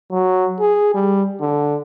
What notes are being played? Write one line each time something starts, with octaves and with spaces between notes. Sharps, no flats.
F#3
G#4
G3
D3